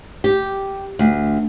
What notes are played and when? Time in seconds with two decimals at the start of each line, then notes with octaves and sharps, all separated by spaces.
0.24 G4
0.99 D2